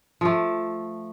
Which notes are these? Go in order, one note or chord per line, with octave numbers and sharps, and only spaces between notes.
F3 A3